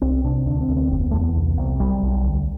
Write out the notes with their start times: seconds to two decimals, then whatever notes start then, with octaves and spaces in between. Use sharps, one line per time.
0.01 C2 C4
0.24 C3 D4
0.46 D2 D4
0.61 C4
0.69 D2
0.76 C4
0.91 F1 C4
1.00 B3
1.11 E2 A3
1.20 B3
1.36 C2
1.57 C2
1.80 B1 G3
2.03 B1
2.24 D2